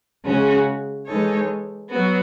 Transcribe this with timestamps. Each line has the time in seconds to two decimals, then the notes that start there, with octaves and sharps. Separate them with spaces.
0.24 C#3 G#3 C#4 F#4
1.06 E3 G#3 D#4 A4 C#5
1.89 F#3 B3 F#4